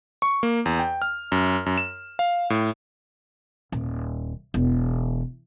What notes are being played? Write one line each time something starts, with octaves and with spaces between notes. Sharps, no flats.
C#6
A#3
E2
G5
F6
F#2
F#2
E7
F5
A2
D#1
E1